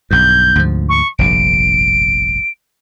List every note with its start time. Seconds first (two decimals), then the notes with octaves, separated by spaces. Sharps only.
0.11 B1 G2 G6
0.55 D2 G#2 F3
0.89 C#6
1.19 F1 A#1 G2 D7